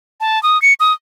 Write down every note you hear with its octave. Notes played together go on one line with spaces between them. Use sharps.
A5
D#6
C#7
D#6